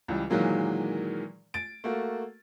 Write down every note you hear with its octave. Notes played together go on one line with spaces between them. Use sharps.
C#2 E3 G3
A#2 D#3 E3 F#3 G#3 A#3
A6 D7
A3 A#3 F#4